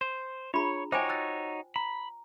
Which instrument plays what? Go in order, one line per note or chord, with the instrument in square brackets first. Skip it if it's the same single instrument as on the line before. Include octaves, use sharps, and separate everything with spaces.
[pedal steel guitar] C5
[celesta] D4 G#4 A#5 [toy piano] F4 B5 [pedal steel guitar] C#5
[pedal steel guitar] D#4 F#4 C#5 [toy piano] C5 G5 G#5 [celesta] D6
[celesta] E6 F#6 A6
[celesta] A#5 [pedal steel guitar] B5